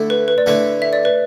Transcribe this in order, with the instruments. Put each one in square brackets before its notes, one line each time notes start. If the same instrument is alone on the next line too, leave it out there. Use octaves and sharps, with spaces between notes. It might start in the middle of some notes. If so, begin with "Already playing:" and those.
Already playing: [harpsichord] D3 A3 E4
[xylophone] B4
B4
D5
[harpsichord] D3 A3 E4 [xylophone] B4
[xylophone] E5
D5
B4